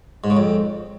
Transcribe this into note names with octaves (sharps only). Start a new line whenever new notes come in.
G#2
C#3
F2